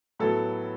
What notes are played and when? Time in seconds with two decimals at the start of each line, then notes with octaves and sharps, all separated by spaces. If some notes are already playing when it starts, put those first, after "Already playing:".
0.19 A2 F#3 B3 A4